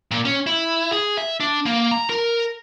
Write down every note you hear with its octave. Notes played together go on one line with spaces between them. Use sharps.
A#2
C#4
E4
G#4
E5
D4
A#3
A#5
A#4